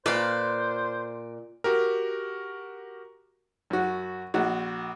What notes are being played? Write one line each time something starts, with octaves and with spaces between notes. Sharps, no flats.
A#2 B4 C5 D5 F5 B5
F#4 G4 A#4
F#2 F#4
A#1 F#4